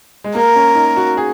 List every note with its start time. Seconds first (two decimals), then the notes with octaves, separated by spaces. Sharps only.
0.24 G#3
0.35 A#3 A#4
0.56 C#4
0.75 D#4
0.96 F#4
1.17 G#4